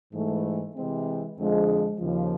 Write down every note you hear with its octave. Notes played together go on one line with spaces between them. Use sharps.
G#2 E3 A3
C3 E3 G#3 C4
F2 D3 F3 G#3
D#2 C#3 F3